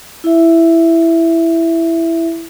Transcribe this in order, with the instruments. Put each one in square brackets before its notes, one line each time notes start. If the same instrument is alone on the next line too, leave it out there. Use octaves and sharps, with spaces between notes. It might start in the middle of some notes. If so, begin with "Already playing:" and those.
[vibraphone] E4 E5